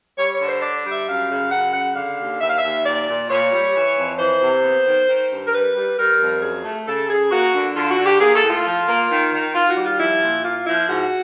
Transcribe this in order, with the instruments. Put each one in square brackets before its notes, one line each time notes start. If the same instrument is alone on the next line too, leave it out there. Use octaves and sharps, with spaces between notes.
[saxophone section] G3 C#5
C#5
D3
C5
D4 D5
G3
E5
F#2 F5
C#3
F#2 F#5
C#3 F#5
D3 F5
D#2
D#2 E5
F5
D#2 E5
A#2 D5
A#2
A#2 C#5
G3
E3
F2
E3 C5
C3
B3
D#3
D#3
G2
A#4
G3 B4
G3
G3 A#4
F2
F#2 G#4
A3
C#3 A4
C#3 G#4
A#3 F#4
D3
D3 F4
F#4
D3
G4
A#3 G#4
A4
A2
F4
F3
A#3
D#3
D#3
D#3 F4
F#4
G3
F4
F3 E4
A#2
A#3 F4
F3 E4
G#2 F#4